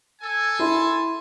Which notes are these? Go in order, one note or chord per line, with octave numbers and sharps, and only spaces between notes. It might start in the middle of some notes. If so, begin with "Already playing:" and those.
A4 G#5
E4 C6